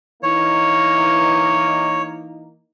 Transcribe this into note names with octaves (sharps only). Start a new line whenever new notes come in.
E3 A#3 D#4 C#5